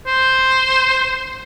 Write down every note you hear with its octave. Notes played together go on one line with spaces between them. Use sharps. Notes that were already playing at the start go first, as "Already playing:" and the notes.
C5